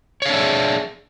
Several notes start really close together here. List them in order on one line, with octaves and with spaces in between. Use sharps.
C#5 F5 D4 E5 G#4